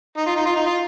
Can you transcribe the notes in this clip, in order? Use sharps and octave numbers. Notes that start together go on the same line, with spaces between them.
D#4
F4
D#4
F4
D#4
F4